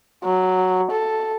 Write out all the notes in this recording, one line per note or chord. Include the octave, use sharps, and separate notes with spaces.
F#3
A4